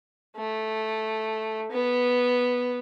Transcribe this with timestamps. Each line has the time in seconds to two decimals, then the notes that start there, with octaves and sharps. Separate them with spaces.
0.36 A3
1.72 B3